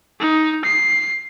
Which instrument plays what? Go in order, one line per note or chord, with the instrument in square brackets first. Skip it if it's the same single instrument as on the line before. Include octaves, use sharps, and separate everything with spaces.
[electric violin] D#4
C7